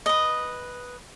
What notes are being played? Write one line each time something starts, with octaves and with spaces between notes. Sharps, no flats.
B4 D#5